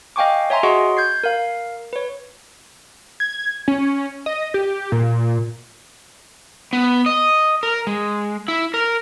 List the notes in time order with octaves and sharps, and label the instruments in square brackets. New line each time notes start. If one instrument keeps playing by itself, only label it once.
[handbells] D#5 F5 G5 G#5 C#6 D6
C#5 E5 G#5 A#5 C6
F#4 G#4 D#5 F#5 C6 C#6
G6 G#6 C7
A#4 F5
B4 C#5
[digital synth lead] G#6
C#4
D#5
G4
A#2
[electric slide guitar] B3
D#5
A#4
G#3
E4
A#4